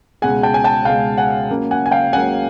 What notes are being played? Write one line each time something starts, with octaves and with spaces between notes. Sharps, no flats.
C#2 B2 G#3 F#5 G#5
G5 A5
G#5
G5 A5
C#2 B2 G#3 F5 G5
F#5 G#5
C#2 C#3 F#3 A#3
F#5 G#5
G#5
F5 G5
C#2 C#3 F#3 A#3 F#5 G#5